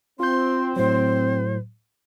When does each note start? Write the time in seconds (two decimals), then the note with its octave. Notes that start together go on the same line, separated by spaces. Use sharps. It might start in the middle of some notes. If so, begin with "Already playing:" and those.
0.20 C4 F4 C6 G6
0.76 A2 F#3 C5